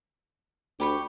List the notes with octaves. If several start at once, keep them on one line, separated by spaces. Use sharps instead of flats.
D2 G4 B5 C#6